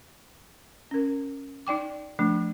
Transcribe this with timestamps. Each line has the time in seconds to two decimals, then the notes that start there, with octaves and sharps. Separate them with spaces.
0.91 C#4 A#4
1.67 D#4 D5 G5 D6
2.19 F3 A3 D4